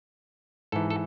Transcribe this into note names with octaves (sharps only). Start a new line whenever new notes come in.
G#2 E3 A4
A4